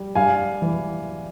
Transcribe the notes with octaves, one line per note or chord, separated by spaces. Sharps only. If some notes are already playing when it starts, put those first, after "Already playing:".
Already playing: G3
G2 F5 G#5
E3